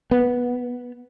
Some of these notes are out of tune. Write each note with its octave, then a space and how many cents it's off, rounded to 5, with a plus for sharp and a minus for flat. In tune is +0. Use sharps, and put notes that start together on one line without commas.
B3 -10